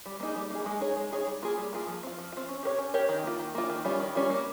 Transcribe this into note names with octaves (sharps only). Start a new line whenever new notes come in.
G3
A#3 D#4 G#4
G3
A#3 D#4 G#4
G#3
D#4 G#4 C#5
G#3
D#4 G#4 C#5
G3
A#3 F4 G#4
G3
A#3 F4 G#4
F3
C4 F4
F3
C4 F4
C#4
G4 A#4 C#5
C#4
G4 A#4 C#5
D#3
A#3 F4
D#3
A#3 F4
D#3
G3 C#4 F4
D#3
G3 C#4 F4
A#3